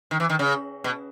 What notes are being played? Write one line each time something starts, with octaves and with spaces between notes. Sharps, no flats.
D#3
E3
D#3
C#3
B2